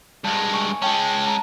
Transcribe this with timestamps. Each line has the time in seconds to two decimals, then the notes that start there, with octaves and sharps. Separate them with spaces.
0.24 G2 G#3 A5
0.54 G#5 C#6
0.82 G#3 C#4 G5 A5
1.25 A5 A#5